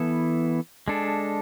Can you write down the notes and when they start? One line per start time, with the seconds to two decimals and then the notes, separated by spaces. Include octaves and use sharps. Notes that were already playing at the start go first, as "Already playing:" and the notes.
Already playing: E3 B3 E4 A4
0.88 G#3 D4 A4